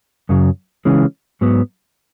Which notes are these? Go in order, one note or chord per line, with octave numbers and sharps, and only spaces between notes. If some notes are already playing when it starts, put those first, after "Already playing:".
F#2 C#3 F#3
C#3 E3 G#3 C#4
G#2 F#3 B3